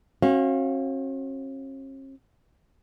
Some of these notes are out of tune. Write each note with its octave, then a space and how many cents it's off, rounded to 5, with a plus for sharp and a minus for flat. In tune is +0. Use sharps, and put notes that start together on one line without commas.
C#4 -45 F#4 +0 F5 -10